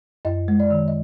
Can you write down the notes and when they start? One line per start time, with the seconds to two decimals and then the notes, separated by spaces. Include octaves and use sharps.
0.25 F#2 D#5
0.48 G#3
0.60 D5
0.71 D#3
0.88 D#5